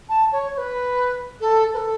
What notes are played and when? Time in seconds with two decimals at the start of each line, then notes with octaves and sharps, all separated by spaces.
0.09 A5
0.32 C#5
0.54 C#5
0.58 B4
1.41 A4
1.74 B4
1.77 A4